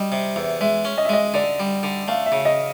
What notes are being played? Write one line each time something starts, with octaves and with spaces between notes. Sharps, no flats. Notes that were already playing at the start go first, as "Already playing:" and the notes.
Already playing: G3 D#5
C3
E2
G#3 E5
C#4
D#5
E5
G#3 D#5
D3 D5
G3
D3
A3 F5
E5
C#3
D#5